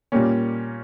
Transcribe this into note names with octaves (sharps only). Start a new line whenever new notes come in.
A#2 G3 A#3 C#4